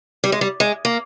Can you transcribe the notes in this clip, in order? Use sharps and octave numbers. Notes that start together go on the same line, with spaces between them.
G3
G#3
G3
G#3
A#3